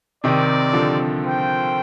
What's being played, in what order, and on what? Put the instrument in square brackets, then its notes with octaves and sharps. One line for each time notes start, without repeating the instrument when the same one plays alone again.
[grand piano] C3 D#3 [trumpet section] C4 G4 A#4 D5
[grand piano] D3 F3
[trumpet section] F4 C5 G5